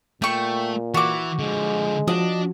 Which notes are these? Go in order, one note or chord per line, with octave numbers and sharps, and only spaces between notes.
A#2 A3 G5 C#6
E3 F#4 D6
D3 F3 G#3
F3 D4 F#4 D#5